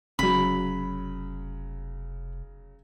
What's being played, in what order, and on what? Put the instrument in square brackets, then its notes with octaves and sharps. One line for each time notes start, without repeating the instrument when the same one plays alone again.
[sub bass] F1 [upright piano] C#3 F#3 [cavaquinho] B5